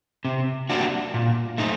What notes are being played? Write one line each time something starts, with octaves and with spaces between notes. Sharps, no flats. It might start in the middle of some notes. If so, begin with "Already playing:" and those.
C3
G3 A#3 D4 F#4
A#2
A3 D#4